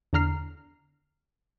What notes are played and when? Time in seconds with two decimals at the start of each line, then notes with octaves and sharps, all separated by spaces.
0.13 E2 D3 A#5 F6 C7